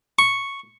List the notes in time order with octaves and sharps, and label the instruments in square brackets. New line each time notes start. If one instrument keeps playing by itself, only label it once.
[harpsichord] C#6